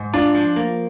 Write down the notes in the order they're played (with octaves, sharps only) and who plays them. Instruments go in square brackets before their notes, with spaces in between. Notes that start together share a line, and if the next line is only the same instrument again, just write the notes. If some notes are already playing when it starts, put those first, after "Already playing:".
Already playing: [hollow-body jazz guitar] G#2
[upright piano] D4 [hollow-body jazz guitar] F4
[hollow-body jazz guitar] F3
A#3